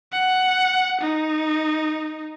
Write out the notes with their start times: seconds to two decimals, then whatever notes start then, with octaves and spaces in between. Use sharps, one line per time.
0.12 F#5
1.01 D#4